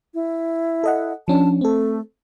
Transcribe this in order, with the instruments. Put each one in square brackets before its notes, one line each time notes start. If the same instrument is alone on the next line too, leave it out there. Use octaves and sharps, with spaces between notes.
[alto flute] E4
[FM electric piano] A4 D#5 F#5
[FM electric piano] F3 C#4 D4 [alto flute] A5
[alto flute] A3 [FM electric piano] C4 A4